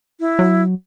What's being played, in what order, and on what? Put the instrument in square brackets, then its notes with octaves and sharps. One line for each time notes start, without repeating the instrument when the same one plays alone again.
[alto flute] E4
[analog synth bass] F#3